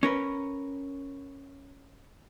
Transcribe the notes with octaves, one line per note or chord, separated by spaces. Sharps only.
C#4 A#4 B4